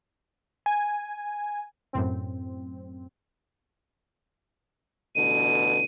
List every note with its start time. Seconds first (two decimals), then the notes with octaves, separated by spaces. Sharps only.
0.66 G#5
1.93 F#2 A2 C4
5.15 A1 B2 D3 D#7